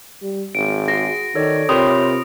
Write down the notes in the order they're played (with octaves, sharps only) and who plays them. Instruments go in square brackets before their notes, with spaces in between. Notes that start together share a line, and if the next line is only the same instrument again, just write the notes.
[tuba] G3
[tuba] G#1 [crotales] D7
[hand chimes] F#4 [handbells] G#4 [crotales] A#6
[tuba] D#3 [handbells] A4 C#5 D5
[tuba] C3 [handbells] F4 A#4 G5 [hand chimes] C#5 B5 C6 [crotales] D#6